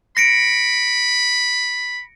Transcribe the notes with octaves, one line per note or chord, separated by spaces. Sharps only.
B5 A#6 C#7 D7